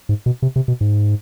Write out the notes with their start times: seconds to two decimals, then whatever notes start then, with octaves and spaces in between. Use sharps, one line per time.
0.09 G#2
0.26 B2
0.42 C3
0.56 C3
0.68 B2
0.81 G#2